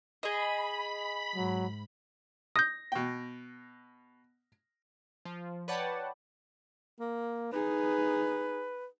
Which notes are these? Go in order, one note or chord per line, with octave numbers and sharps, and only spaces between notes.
G#4 D#5 B5
G#2 F#3
D#6 G6 A#6
B2 G5
F3
B4 C#5 D5 F#5 G5 A5
A#3
D#4 G#4 B4